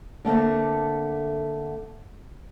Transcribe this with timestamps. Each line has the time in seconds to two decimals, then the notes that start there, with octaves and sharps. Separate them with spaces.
0.25 D3 A3 A#3 C4